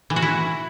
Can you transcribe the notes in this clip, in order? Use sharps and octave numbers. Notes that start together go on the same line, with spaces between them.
E3
F#4
E4